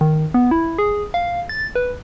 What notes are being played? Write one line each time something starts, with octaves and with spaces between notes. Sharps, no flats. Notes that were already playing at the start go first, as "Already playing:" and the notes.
D#3
B3
E4
G#4
F5
A6
B4